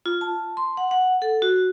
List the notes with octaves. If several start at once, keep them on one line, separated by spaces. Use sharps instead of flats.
F4
A5
C6
F#5
F#5
A4
F#4